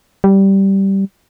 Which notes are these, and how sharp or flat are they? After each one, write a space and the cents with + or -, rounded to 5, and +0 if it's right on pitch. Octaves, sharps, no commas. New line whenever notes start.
G3 -10